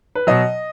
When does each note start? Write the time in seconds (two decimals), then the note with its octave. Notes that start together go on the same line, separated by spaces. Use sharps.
0.15 B4
0.27 B2 F#3 D#5